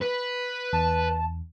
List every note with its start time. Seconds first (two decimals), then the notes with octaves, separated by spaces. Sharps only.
0.02 B4
0.73 E2 A5